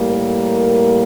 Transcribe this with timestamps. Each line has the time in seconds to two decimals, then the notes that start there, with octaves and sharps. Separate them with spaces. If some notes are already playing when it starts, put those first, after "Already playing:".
Already playing: A2 G3 A#3
0.12 A#4